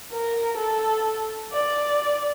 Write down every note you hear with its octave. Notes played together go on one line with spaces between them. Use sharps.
A#4
A4
D5